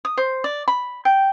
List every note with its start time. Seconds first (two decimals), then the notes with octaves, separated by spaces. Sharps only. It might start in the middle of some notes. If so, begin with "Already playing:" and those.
0.05 D#6
0.17 C5
0.44 D5
0.68 B5
1.05 G5